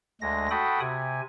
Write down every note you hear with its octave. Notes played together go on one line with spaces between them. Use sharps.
D2 G#3 A#6
F#4 A4 G5 B5 D#6
C3 G#5